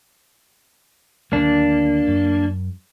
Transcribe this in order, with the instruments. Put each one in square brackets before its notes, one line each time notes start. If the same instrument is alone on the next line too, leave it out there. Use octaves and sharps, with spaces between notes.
[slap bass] D2 D#3 F#3 [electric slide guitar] A#3 D4
[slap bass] F#2